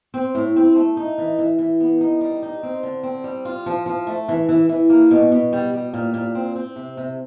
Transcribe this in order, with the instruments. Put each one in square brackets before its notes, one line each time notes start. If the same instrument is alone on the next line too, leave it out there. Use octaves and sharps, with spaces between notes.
[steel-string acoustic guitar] C4
A2
C4
A3
D#4
E3
E3
E3
B3
D#4
G3
D#4
C4
D3
C4
G3
F4
F3
F3
A3
E3
E3
E3
A#3
B2
B2
G3
G3
A#2
A#2
C4
C4
C3
C3